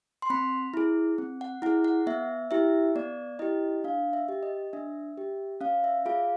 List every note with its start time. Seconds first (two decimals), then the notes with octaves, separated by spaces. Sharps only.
0.22 C6
0.30 C4 B5
0.74 E4 G#4
1.18 C4
1.41 F#5
1.62 E4 G#4 F#5
1.84 F#5
2.07 B3 E5
2.51 E4 G4 E5
2.96 B3 D5
3.39 E4 G4 D#5
3.84 D4 F5
4.13 E5
4.28 G4
4.43 D#5
4.73 D4 E5
5.17 G4
5.61 C#4 F5
5.84 E5
6.06 F4 G#4 F5